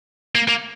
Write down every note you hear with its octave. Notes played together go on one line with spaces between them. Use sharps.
A#3
A#3